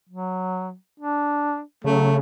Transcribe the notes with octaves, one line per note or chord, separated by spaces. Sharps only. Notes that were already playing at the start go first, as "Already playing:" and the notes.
F#3
D4
C#3 F#3 A3